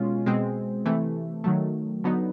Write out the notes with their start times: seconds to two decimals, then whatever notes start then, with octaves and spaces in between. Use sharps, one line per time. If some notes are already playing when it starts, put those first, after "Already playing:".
Already playing: B2 G#3 C#4 F4
0.26 B2 G#3 C4
0.86 C3 E3 A3
1.44 D#3 F#3 A3
2.04 D3 F#3 B3 D#4